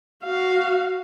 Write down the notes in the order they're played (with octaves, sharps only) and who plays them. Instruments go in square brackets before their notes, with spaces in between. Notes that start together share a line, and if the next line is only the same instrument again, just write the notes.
[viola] F#4 F5